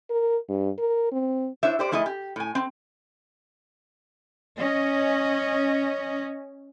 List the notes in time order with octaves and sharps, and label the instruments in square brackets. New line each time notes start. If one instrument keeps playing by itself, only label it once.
[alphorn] A#4
G2
A#4
C4
[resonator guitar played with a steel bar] D4 E4 C5 C#5 E5
G4 C5 D5
F3 A3 D4 E4 G#4 D#5
G4
A2 G#5
C4
[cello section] C#4 D#5